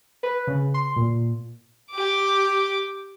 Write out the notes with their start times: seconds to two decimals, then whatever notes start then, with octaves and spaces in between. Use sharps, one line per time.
0.23 B4
0.47 C#3
0.74 C6
0.96 A#2
1.91 G4 D6